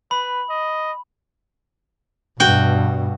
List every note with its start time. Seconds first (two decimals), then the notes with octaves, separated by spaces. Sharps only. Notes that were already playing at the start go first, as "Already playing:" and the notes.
0.11 B4 B5
0.49 D#5
2.40 G2 B2 F#4 G5